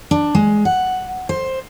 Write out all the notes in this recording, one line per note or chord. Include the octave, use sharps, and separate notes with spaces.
D4
G#3
F#5
C5